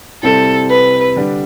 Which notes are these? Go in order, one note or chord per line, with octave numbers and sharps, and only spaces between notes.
C3 G3 C4 E4 A4
B4
D3 G3 D4